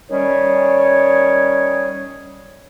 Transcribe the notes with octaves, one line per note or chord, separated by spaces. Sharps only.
D#3 G3 C#4 G#4 C#5